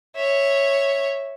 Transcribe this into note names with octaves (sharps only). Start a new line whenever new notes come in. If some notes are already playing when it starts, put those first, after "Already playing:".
C#5 E5